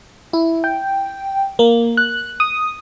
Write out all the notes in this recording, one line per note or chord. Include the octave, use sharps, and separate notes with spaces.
E4
G5
A#3
F#6
D#6